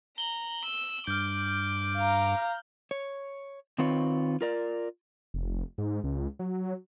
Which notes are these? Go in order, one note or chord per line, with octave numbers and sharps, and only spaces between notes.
A#5 F#7 G7
E6
G2 D6 F6 G6
F5 A#5
C#5
D#3 C4 F4 B4 C#5
F4 A#4 D5
F1
G#2
C#2
F#3